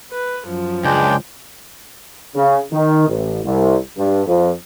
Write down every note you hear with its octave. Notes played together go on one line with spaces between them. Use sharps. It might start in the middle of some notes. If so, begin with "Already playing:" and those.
B4
F#2 F3
C#2 G#3 D4 G5
C#3
D#3
A1
C2
G2
F2